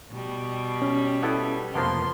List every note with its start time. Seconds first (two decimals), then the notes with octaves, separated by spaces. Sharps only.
0.14 B2 G3
0.82 C#4
1.23 B3 E4 A4
1.75 F2 C3 F3 A#3 B3 A5 C6